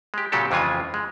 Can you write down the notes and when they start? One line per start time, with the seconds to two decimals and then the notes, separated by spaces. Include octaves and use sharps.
0.14 G#3 G4
0.32 A#2 C#3 F#3 F#4 G4 A4
0.51 F2 C#3 E3 G#3 F4 G#5
0.94 G#3